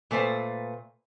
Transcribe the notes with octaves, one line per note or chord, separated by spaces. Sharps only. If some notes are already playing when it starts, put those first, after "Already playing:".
A#2 A3 B4 C5